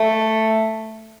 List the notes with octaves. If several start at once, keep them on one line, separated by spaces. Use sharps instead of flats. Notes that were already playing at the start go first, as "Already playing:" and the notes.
Already playing: A3